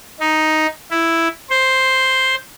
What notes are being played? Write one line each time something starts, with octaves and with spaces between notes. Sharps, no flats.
D#4
E4
C5